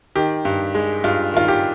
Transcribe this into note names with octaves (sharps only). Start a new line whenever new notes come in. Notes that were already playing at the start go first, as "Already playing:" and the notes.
D#3 G4
G2
G#3
G2 F4
D#3 F4
G4